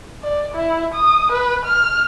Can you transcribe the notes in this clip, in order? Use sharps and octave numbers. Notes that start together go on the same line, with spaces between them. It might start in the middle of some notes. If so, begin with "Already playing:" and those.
D5
E4
D#6
B4
F6